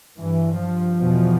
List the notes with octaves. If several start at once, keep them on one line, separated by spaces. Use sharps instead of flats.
G2 E3
F3
E2 B2